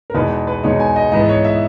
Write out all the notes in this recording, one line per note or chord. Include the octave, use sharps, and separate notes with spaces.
A#4
E2 B2 G#3 D#4 B4
B4
E2 B2 G#3 D#4 C#5
G#5
D#5
G#2 E3 B3 D#5
C#5
E5